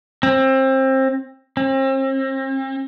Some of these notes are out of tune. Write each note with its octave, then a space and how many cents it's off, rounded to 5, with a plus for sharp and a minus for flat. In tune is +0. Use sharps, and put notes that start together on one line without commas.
C4 +25
C4 +40